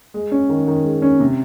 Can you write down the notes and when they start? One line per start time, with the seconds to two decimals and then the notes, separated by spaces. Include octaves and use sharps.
0.14 G#3
0.32 C#4
0.49 D#3
0.67 D#3
0.85 G#3
1.02 C#4
1.20 C3